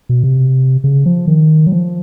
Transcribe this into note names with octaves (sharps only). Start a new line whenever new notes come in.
B2
C3
C#3
F3
D#3
F#3
F3